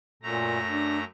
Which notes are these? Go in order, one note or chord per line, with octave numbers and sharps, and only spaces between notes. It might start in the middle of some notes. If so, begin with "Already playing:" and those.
F#2 A#2 A3 A#5
D4